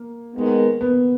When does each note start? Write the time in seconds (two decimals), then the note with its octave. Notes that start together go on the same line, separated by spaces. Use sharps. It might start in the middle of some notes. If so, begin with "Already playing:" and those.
Already playing: A#3
0.34 D#3 G#3 B3
0.81 B3